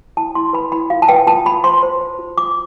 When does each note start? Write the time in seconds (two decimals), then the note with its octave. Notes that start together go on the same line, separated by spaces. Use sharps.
0.17 E4 A5
0.35 E4 C6
0.53 B4 B5
0.72 E4 B5
0.90 F4 F5
1.02 A5
1.08 B4 G5
1.27 F4 A5
1.45 F4 B5
1.64 C5 C6
1.83 C5
2.01 C5
2.19 F4
2.37 F4 D6